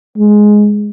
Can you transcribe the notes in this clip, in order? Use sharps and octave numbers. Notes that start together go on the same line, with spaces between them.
G#3